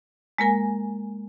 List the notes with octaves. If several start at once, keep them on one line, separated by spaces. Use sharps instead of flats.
G#3 A#3 A#4 G#5